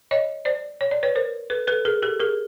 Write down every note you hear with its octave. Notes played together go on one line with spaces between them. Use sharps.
C#5 D#5
C5 D5
C#5
D5
B4 C#5
A#4 C5
A4 B4
A4 B4
G#4 A#4
G4 A4
G#4 A#4